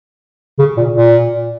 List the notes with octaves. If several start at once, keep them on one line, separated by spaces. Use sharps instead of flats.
C#3
A#2
A#2